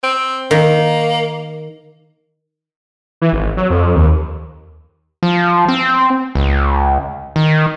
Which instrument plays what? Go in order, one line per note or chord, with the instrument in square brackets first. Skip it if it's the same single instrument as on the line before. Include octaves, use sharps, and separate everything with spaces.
[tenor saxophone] C4
[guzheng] D#3 [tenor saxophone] A#3
[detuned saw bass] E3
G#1
F#3
F2
D#2
[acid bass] F3
C4
C#2
D#3